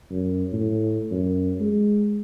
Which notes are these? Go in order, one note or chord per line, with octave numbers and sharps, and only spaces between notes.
F#2
A2
F#2
G#3